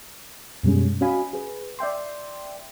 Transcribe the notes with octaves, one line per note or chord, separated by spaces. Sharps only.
F#2 B2 G3 G#3 C#4
C#4 F#4 D#5 F5 G#5 B5
G#4 B4
D5 E5 G5 C6